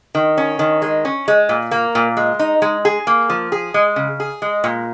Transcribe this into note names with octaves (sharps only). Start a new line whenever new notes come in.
D#3
C#4
D#3
G#3
C#4
G#3
A#2
A#3
A#2
G#3
D#4
G#3
G#4
A#3
F3
G#4
G#3
C#3
G#4
G#3
A#2